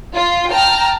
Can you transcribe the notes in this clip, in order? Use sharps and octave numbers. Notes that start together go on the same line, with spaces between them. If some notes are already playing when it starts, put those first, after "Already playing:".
F4
G5 A5 A#5 F6